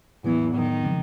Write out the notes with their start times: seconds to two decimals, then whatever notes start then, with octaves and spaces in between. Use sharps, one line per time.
0.24 E2 A2 E3 F#3 B3
0.54 A2 D#3 F#3 B3
0.84 C#3 F3 G#3 C4